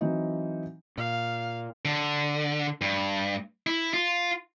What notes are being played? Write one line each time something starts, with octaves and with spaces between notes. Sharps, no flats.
E3 F#3 C4 D#4
A#2 F5
D3
G2
E4
F4